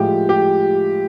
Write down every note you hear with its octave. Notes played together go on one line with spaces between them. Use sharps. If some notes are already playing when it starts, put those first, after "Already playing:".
Already playing: A2 F3 G#3 G4
G4